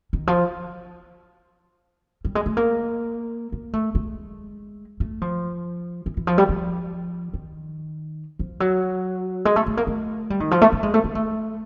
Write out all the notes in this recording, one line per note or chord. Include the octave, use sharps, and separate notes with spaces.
D#3
F3
G3
G#3
A3
A#3
A#3
A3
G#3
A3
F3
E3
E3
F3
G3
F3
D#3
F3
F#3
G#3
A3
A3
A#3
A3
G3
D#3
F3
A3
A3
G#3
A3
A#3
A3